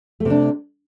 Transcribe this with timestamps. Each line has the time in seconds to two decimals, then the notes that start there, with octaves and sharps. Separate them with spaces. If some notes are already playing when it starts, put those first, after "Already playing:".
0.20 A3
0.25 C3
0.30 D4